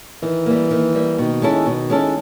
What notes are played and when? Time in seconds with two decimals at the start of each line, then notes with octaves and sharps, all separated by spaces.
0.22 D#3 E3
0.46 G3 A#3
0.71 D#3
0.95 G3 A#3
1.18 B2 D#3
1.42 G#3 C#4 E4 A4
1.66 B2
1.90 G#3 C#4 E4 A4